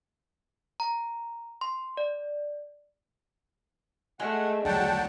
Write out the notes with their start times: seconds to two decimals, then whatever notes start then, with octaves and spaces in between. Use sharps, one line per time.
0.80 A#5
1.61 C6
1.97 D5
4.20 G#3 A3 F#5
4.65 D2 F#3 D4 F#5 G5 A5